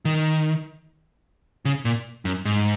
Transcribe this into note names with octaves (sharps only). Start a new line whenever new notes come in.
D#3
C#3
A#2
F#2
G#2